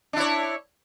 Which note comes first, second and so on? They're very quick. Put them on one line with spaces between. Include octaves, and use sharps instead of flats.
D4 E4 C#5